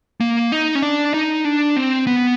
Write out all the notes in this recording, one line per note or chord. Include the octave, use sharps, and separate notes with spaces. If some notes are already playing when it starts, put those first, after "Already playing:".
A#3
D#4
C#4
D4
D#4
D4
C4
B3